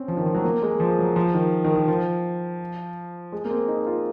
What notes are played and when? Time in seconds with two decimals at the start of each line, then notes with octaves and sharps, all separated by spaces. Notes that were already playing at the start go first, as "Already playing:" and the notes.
Already playing: C4 C#4
0.08 F3
0.17 D#3
0.26 F3
0.35 F#3
0.44 A#3
0.62 G#3
0.80 F3
0.99 F#3
1.16 F3
1.34 D#3
1.64 D#3
1.76 D#3
1.88 F3
3.32 G#3
3.45 A#3
3.50 C4
3.68 D#4
3.87 F4